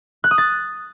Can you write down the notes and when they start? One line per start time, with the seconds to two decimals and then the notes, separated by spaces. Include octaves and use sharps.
0.24 F#6
0.31 D#6
0.38 A6